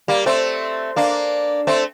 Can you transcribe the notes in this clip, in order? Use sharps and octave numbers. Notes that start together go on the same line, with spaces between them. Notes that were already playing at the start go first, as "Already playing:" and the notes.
G3 A#3
A3 C4
A#3 D4
A3 C4